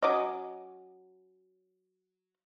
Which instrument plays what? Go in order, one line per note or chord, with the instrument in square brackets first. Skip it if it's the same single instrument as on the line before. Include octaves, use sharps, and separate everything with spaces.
[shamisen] F#3 C#4 [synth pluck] D#5 D6 D#6